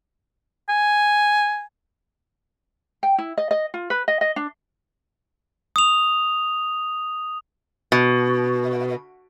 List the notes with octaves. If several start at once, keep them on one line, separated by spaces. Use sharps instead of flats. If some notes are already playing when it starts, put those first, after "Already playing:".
G#5
G5
E4
D#5
D#5
F4
B4
D#5
D#5
D4
D#6 F7
B2